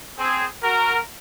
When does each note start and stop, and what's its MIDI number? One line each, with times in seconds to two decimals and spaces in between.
0.18 0.45 60
0.18 0.45 68
0.62 0.97 66
0.62 0.97 70